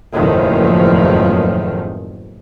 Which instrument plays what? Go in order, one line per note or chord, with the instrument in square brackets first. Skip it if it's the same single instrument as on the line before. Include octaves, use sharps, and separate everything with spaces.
[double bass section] F#1 E2 A2 D#3 F3